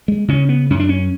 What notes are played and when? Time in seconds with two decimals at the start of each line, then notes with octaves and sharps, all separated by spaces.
0.08 G#3
0.28 C#3 C#4
0.49 B3
0.70 F#2 C#4
0.80 D4
0.89 C#4